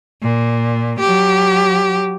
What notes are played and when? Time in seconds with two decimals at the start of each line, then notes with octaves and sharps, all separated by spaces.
0.23 A#2
0.99 F#3 G4